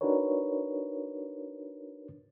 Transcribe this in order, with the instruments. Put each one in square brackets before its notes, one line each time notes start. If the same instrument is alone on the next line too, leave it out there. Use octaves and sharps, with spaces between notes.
[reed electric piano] D4 D#4 F#4 A#4 B4 C#5